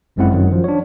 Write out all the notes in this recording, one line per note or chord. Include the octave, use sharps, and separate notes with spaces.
G1 F#2 G#3 C4 E4 F#5
F#2 D#3 F#3
F3
D4 C#5